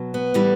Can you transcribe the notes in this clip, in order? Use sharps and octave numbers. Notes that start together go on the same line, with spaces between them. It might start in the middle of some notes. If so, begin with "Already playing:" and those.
Already playing: B2 F#3
B3
A2 E3 G3